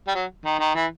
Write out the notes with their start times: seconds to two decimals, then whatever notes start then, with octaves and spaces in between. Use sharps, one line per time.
0.07 G3
0.15 F#3
0.45 D#3
0.59 D#3
0.75 E3